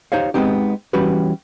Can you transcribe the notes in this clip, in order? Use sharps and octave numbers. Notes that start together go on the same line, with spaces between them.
D#4 G4 C5 C#5 F5
G#3 A3 B3 C4 D#4 G4
E3 G3 C#4 F#4 G4 B4